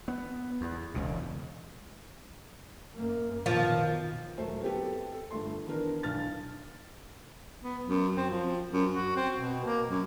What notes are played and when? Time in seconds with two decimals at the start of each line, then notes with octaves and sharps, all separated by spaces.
0.08 B3
0.61 E2
0.95 E1 C#2 A#2
2.95 F#2 A#3
3.46 B2 D#3 F3
4.37 E1 F#3 A3 C5
4.61 B3 C4 G4 A4
5.12 A4
5.31 G1 A3 C6
5.66 D#3 E3 B3 D4 A#4
6.03 B1 D4 F6 A6
7.63 B3
7.84 F#2
8.17 C4
8.30 F3
8.72 F#2
8.92 F#4
9.16 C4
9.37 B2
9.65 A#3
9.90 F#2